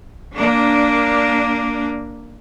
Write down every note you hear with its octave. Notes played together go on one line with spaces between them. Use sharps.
A#3 D4